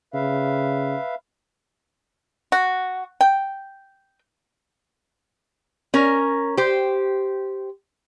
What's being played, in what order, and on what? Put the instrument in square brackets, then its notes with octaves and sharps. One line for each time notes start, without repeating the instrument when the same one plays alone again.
[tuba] C#3 [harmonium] B4 E5 F5
[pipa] F#4
G5
[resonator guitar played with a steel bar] C#4 A#4
G4 C5